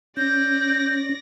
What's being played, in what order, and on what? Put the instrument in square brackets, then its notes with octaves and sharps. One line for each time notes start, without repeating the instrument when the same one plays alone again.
[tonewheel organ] C#4 [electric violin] D5 A#6 [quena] G6